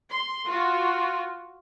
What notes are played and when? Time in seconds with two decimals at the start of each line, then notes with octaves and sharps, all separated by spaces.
0.11 C6
0.45 F4 F#4